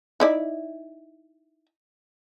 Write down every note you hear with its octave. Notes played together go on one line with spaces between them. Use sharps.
D#4 E4 D5